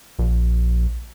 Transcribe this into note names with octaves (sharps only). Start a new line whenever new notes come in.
A#1